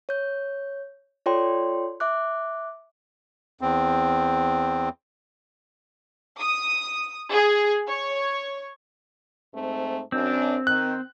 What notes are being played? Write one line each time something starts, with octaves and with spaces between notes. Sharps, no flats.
C#5 G6
F4 A4 C#5 D5 G5 C6
E5 D6 F#6
E2 C4
D#6
G#4
C#5
G#2 A3 C4
F#2 C4 D4
D#3 F#6